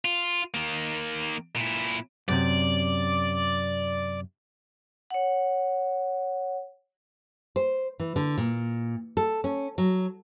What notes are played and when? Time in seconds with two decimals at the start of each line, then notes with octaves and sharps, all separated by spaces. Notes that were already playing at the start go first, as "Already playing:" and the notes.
0.05 F4
0.54 D#3 A#3
1.56 A#2 E4
2.29 F#2 A2 C3 D5
5.11 C#5 F#5
7.56 C5
8.00 E3
8.16 D3
8.38 A#2
9.17 A4
9.44 C#4
9.78 F#3